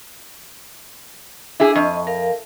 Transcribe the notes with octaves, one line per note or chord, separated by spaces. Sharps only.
D4 E4 G#4
F2 D#5 C#6
A#4 F5